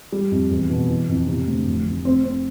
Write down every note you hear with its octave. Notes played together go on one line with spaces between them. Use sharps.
G3
F2
E2
B2
E3
F2
C3
D2
F1
F1
C4
C4